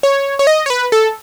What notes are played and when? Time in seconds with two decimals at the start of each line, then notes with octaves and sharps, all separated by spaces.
0.03 C#5
0.39 C#5
0.47 D#5
0.66 C#5
0.70 B4
0.92 A4